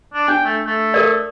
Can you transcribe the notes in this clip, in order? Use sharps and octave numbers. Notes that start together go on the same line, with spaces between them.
D4
D4 G5
A3
A3
A4 A#4 D5